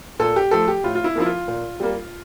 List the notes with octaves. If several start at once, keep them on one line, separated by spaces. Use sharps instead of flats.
A#2 A4
G4
F3 A3 A4
G4
A2 F4
F4
E4
F3 A#3 E4
F4
A#2
G3 A#3